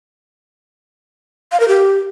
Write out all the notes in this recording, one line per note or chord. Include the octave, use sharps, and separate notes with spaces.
F5
A#4
G4